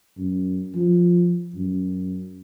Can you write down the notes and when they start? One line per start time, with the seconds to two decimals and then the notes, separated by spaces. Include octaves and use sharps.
0.18 F#2
0.75 F3
1.55 F#2